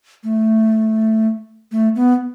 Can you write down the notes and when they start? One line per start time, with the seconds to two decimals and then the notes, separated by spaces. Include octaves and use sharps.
0.24 A3
1.72 A3
1.96 B3